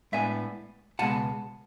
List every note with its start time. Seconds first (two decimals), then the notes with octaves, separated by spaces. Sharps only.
0.12 A2 G#3 B3 D4 E5 G#5
0.99 C#2 B2 G#3 B3 F#5 A5